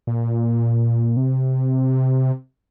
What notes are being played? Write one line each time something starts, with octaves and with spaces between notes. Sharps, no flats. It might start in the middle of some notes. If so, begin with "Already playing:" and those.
A#2
C3